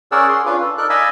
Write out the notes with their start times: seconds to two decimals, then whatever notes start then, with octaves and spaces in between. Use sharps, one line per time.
0.12 C#4 G#4 A#4 D5 F#5 E6
0.29 G#4 C6
0.46 C#4 D4 F4 B4
0.61 A4
0.78 D#4 A4 A#4 D5 F#6
0.90 D5 D#5 F5 G#5 B5 E6